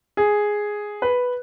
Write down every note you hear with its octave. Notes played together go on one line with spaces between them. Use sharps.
G#4
B4